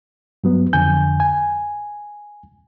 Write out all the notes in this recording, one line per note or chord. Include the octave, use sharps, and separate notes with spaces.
G2 F#3 B3
F2 D3 G#5 G6
G#5